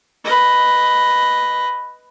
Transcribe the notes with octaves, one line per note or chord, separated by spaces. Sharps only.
B4 D#5